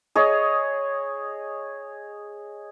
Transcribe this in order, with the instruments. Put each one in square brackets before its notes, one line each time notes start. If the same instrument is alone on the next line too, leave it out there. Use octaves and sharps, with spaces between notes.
[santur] G#4 C#5 D#5